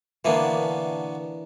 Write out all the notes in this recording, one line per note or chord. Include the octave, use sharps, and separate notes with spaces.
B2 D3 E3 A#3 B3 D4